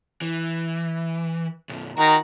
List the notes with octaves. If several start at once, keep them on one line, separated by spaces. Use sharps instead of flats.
E3
B1 F#2
D#3 F#4 A#5